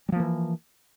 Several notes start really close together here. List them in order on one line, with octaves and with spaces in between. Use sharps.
G3 F3 A#3 E3